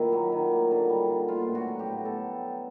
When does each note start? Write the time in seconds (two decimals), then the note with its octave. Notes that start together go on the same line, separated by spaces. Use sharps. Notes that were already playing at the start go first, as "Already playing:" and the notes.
Already playing: A#2 D#3 A#3 E4
0.12 F#3
0.32 D#3
0.51 A#3
0.71 D3
0.89 G3
1.10 D3
1.28 B3 F4
1.47 A2
1.55 F#4
1.67 F#3
1.79 G4
1.87 A2
2.05 B3 A4